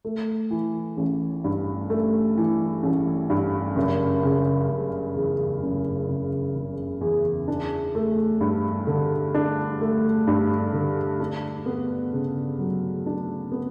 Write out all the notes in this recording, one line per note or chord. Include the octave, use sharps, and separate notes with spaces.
A3
E3
A1
G2
A3
E3
A1
G2
F#1
C#3
F#1
E2
F#1
C#3
F#1
E2
D4
A3
G2
D3
D4
A3
G2
D3
D4
B3
C#3
F#3
D4
B3